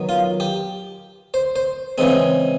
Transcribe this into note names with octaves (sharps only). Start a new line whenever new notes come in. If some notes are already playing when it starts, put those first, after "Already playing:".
Already playing: D#3 F#3 B3
F4
G4
C5
C5
C#3 E3 G#3 C4